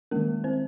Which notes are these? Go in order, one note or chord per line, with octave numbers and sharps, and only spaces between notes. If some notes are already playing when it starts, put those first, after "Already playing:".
D#3 G#3 A#3 C#4 A#4
C4 C5